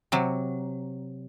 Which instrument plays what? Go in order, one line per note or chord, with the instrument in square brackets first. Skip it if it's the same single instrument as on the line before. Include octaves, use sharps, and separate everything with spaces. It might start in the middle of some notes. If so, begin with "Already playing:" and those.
[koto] C3 F#3